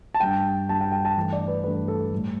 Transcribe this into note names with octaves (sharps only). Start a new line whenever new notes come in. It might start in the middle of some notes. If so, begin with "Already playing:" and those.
A5
G2 G3 G5
G2 G3 A5
G5
G5
A5
G2 E3 A3
D5
B4
G2 E3 A3 B4
A4
A2 G3